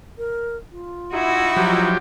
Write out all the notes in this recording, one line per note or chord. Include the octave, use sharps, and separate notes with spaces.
A#4
F4
D#4 E4 F#4
F3 F#3 G4